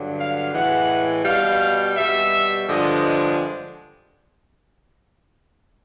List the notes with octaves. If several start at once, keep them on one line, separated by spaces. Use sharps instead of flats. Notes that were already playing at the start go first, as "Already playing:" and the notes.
Already playing: G2 D3 F#3
F5
A2 E3 G#3 F#5
B2 G3 F5
B2 G3 E5
G2 D3 F3 G#3 D#5